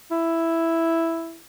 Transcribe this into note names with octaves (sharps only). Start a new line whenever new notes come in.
E4